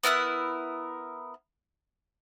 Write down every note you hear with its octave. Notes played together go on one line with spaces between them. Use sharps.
B3 E4 A#4 F#6